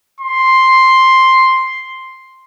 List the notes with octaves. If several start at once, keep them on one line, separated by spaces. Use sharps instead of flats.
C6